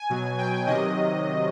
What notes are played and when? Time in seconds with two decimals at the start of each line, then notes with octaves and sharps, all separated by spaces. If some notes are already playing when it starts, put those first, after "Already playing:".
Already playing: G#5
0.10 B2 F#3
0.38 G5
0.67 C3 D#3 F#3 D#5